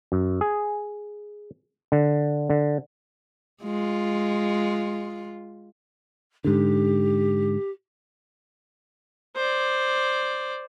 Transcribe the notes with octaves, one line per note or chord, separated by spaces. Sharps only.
F#2
G#4
D3
D3
G#3 F4
G#2 D3 G4
C5 D5